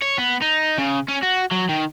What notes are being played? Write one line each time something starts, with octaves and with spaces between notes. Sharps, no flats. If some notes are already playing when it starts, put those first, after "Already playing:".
C#5
B3
D#4
C#3
C#4
F#4
F#3
D#3